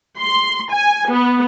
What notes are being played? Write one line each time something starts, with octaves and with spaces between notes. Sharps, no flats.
C6
G#5
B3